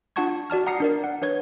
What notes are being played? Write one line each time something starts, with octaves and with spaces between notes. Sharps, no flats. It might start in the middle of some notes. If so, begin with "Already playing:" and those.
D4 F4 F#5 A5 C#6 G#6
F#4 D5 A5 F6
F#5 A#5 D#6 C7 C#7
D4 A#4 D5
F#5
D4 B4 C#5 G#6